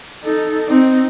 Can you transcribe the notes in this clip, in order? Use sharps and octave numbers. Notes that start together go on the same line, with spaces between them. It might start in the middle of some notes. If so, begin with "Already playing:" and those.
D#4 A4
C4 D#4